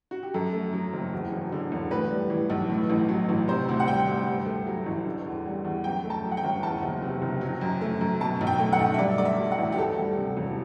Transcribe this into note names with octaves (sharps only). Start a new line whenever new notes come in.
F#4
G4
F#2 A4
A3
F#3
F#1
E2
E1
D3
E1
A2 B4
G3
E3
B1
A2
A1
F#3
A1
C3 C5
D2
F#5
G3 G5
D2
G2
A3
F#3
A1
D3
E2
G3
E2
F#2 G5
A3
A5
F#3
F#5
G5
G1
E2 A5
F#1
C3
F#1
F#3
F#2
A3
F#2
B2 A5
B1
G5
A3
F#5
B1
E5
G2 D5
A3 D5
E5
F#3
F#5
A1
G4
D2 A4
G3
C3
E1